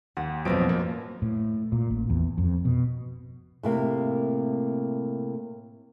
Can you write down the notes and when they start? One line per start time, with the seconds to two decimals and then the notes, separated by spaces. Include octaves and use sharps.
0.17 D#2 F#5
0.45 A1 F2 B2 F3 F#3 D7
0.69 F3 A#3
1.22 A2
1.72 A#2
1.90 A1
2.10 E2
2.38 F2
2.65 B2
3.63 A2 C3 A#3